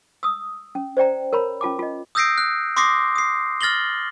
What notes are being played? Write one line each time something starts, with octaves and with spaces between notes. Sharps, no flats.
D#6 E6
C#4
C5 D5 G5 A#5
A#4 C#5 A#5 B5
C#4 F4 A5 D6
F4 D#5
D#6 E6 G6 A#6 C7 D7
F#6
C6 D6 D#6 A#6 C7
D#6 C7
F6 A6 A#6 F#7 G7